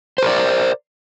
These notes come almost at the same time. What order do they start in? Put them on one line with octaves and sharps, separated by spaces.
C5 A#4 D5